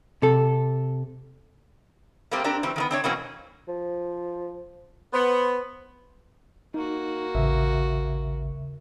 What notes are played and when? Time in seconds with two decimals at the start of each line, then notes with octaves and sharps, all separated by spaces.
0.22 C3 A4
2.31 G3 A3 A#3 C4 G4
2.44 C4 D4 G4 A#4
2.63 G2 E3 C4
2.76 D#3 A3 B3
2.91 C4 D4 C#5
3.04 B2 E3 F#3 A#3 C4 C#4
3.68 F3
5.13 B3 C5
6.74 A#3 D#4 F#4
7.35 A1 D#2 C#3 E5